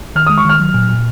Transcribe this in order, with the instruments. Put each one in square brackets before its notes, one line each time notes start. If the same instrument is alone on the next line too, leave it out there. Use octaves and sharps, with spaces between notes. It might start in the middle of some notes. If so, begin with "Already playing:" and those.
[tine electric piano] D#3 [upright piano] F6
[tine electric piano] G#3 [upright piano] D#6
[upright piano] C#6
[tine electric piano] D#3 [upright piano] F6
[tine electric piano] F#3
A#2
A#2